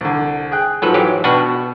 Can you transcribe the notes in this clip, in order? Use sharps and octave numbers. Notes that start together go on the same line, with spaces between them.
C2 D3
G#4 G5 F#6
G#2 F3 F#3 A4 B4
E3 F#3 G4
B2 D4 F#4 B4 G5 F6